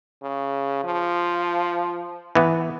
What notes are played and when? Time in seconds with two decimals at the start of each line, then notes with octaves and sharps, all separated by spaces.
0.23 C#3
0.84 F3
2.35 E3 B3